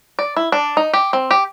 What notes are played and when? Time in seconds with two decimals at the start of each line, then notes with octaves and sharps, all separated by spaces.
0.19 D5
0.36 E4
0.52 D4
0.77 D#4
0.93 G4
1.13 C4
1.31 G4